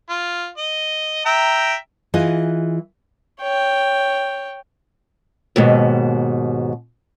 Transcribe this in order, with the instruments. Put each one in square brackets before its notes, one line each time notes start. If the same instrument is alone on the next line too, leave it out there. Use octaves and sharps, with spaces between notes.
[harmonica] F4
D#5
E5 G5 A#5
[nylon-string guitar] E3 F4 G#4 D#5
[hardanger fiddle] C#5 G5
[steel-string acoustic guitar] D#2 G#2 B2